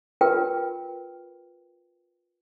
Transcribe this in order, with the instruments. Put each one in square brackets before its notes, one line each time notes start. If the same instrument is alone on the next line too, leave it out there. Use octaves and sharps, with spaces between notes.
[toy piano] F4 A#4 B4 G5